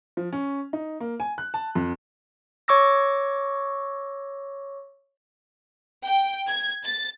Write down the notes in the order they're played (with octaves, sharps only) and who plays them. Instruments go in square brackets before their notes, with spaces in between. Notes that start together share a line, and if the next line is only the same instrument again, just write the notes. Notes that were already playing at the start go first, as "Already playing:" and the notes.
[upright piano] F3
C#4
D#4
A#3
G#5
F#6
A5
F2
[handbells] C#5 C#6 D6 E6 A#6
[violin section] G5
G#6
A6